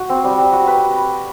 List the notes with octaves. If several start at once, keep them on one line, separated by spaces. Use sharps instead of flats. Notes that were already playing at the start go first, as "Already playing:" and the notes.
Already playing: F#4
C4
G3
G3
F#4
B4